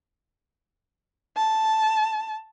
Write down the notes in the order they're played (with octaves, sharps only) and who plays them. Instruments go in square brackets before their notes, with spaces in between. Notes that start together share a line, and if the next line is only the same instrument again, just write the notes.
[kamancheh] A5